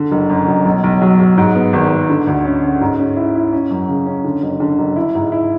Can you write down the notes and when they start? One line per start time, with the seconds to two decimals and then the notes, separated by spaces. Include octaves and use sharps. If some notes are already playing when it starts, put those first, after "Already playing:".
Already playing: D3
0.11 F#1
0.30 F#2
0.48 F#1
0.65 B1
0.84 B1
1.01 F#3
1.19 F#3
1.38 G#2
1.55 B3
1.73 G#1
1.92 G#1
2.10 D3
2.27 D2
2.45 C#4
2.63 C#4
2.81 G#2
2.99 C#4
3.17 E4
3.35 E4
3.53 C#4
3.71 F#2
3.89 C#3
4.06 C#4
4.24 D3
4.43 F#1
4.60 D3
4.78 F#1
4.96 E4
5.15 G#2
5.32 E4